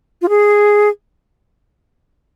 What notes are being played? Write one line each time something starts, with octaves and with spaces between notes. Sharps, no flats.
F4
G#4